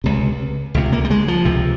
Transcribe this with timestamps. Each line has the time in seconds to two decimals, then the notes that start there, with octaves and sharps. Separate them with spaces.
0.04 C#2 C3
0.74 C#2 C3
0.92 A#3
1.04 G3
1.10 G#3
1.28 F3
1.45 C#2 C3